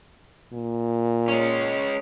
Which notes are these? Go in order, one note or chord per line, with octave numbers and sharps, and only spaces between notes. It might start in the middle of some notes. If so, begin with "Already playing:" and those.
A#2
G#3 C#4